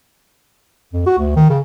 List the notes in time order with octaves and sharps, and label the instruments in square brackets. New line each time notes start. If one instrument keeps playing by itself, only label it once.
[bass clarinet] F2
F#4
D2
D#3
C#3